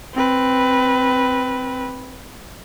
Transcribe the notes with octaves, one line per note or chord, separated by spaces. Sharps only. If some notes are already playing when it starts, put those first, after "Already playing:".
C4 B4